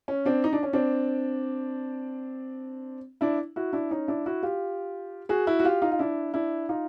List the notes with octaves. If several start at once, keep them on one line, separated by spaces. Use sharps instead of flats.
C#4
C4 D4
D#4
D4
C#4
C4 D4
D4 E4
E4 F#4
D4 E4
C#4 D#4
D4 E4
E4 F#4
F4 G4
F#4 G#4
E4 F#4
F#4
F4 G4
D#4 F4
F4
D4 E4
D4 E4
D#4 F4